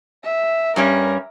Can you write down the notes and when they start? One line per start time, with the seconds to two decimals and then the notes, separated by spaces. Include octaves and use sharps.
0.24 E5
0.76 G2 G3 C#4 A#4